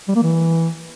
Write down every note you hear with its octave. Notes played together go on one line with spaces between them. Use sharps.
G3
A#3
E3